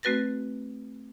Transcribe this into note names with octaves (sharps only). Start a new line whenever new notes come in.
A3 C4 F#4 B4 A6 A#6